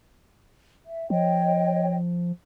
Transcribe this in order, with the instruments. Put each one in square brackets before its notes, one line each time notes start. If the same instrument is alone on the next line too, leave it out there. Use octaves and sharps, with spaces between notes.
[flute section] E5
[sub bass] F3 [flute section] C#5 D#5 G5